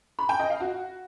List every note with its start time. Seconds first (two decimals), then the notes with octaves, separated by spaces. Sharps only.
0.19 B5
0.29 G5
0.40 D#5
0.50 F5
0.60 F#4